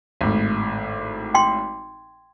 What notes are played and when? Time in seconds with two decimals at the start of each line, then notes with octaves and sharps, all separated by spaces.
0.21 G#1 A2
1.35 G5 C6